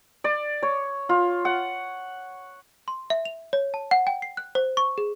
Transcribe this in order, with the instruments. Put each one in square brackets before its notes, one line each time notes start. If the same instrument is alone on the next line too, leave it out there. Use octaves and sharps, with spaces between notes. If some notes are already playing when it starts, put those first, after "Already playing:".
[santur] D5
C#5
F4
F#5
[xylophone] C6
E5
F7
C#5
A5
F#5
G5
C7
F#6
C5
C#6
G#4